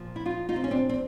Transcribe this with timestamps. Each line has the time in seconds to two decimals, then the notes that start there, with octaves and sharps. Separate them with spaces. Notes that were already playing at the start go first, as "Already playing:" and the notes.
Already playing: A#2 F3
0.16 E4
0.25 D#4 F4
0.49 D#4 F4
0.56 C4
0.64 C#4
0.71 C4 D4
0.89 C4